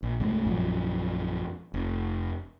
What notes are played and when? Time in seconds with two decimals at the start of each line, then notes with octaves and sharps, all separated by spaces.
0.03 A#1
0.20 C2 G2 G#3 A3
0.45 A#1 F#2 F3
1.74 F1